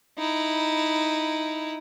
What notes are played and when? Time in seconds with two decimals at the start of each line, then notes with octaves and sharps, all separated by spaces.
0.18 D#4 E4